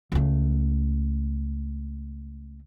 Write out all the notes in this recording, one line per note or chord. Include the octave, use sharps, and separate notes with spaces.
C#2 A3